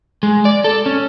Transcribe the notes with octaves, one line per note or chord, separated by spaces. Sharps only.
G#3
D5
A4
C#4